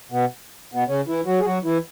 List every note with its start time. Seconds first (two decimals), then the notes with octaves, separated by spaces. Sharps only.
0.12 B2 B3
0.74 B2 B3
0.88 C#3 C#4
1.07 E3 E4
1.26 F#3 F#4
1.40 G#4
1.45 F#3 F#4
1.64 E3 E4